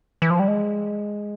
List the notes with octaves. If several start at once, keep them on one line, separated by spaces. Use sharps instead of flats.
E3
F3
G3
G#3